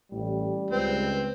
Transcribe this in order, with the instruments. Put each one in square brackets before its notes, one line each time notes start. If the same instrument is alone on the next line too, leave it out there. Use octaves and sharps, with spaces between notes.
[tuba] A1 [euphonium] G3
[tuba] C#2 [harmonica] C4 [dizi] B4